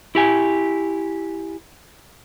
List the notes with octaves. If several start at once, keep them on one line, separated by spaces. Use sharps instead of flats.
E4 G4 G#5